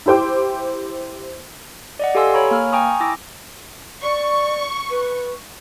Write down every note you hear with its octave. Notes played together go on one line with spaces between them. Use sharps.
E4 G4 C5 G5 D6
D5 D#5 F#5
G4 A4 F5 G#5 C6 E6
C#5 A#5 B5 C#6
A#3 G#5 F6
G5 G#5 A#5 C#6 D#6
E4 D6 E6 A#6
D5 C#6
B4